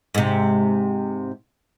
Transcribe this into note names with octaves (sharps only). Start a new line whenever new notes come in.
G#2 C3